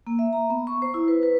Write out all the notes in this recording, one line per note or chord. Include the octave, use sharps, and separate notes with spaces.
A#3
E5
A#5
B3
C#6
C5
E4
B4
B4